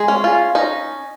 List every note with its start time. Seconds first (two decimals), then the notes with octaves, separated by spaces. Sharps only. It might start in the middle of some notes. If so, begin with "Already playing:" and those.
Already playing: G#3 G#4
0.08 C#4
0.24 F4
0.55 C#4 D#4